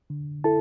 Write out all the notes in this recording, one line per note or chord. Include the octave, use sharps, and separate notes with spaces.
D3
E4 A4 A5